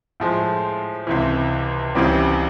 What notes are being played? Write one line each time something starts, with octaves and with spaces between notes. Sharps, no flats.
A2 F3 G#3
C#2 C3 E3
C#2 C#3 E3 G3 C4